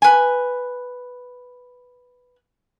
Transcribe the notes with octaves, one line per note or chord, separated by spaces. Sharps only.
B4 G#5